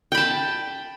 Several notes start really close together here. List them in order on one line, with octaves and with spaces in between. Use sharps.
G5 B5 A5